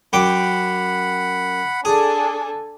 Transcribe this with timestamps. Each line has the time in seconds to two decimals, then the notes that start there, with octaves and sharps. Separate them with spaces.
0.13 F#2 F#5 G5 B5 D6
1.85 D4 G#4 A4 G#5